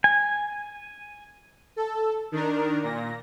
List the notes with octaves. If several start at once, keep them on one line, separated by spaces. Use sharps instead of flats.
G#5
A4
D#3 D4 A#4
A#2 A#6